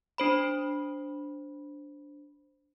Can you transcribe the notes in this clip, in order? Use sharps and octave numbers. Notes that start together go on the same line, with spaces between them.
D4 C5 B5